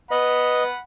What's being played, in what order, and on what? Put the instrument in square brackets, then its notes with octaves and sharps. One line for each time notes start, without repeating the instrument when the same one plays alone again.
[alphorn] B4 [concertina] D#5 [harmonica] F#5 B5